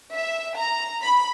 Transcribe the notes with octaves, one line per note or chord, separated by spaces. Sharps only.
E5
A#5
B5